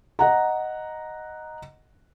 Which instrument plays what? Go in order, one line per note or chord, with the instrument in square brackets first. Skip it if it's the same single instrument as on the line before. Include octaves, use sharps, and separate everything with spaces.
[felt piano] D#5 F#5 A#5